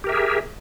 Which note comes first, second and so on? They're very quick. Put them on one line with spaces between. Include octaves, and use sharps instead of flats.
G4 A#4 E5 G#4